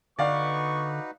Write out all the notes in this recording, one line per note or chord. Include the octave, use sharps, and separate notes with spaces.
D3 B3 D#4 F#4 B4 D5 F5 C#6